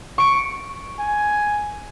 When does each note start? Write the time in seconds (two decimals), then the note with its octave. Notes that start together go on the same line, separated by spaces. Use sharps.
0.18 C#6 D7
0.99 G#5